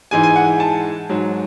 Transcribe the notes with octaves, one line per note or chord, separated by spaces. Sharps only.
G#2 E3 G#3 G#5
G#5
F#5
A5
G#2 F#3